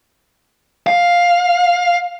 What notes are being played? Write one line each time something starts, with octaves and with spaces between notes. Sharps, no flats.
F5